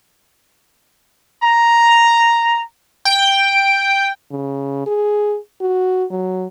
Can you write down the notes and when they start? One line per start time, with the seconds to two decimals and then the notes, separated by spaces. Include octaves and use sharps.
1.42 A#5
3.05 G5
4.31 C#3
4.87 G#4
5.61 F#4
6.10 F#3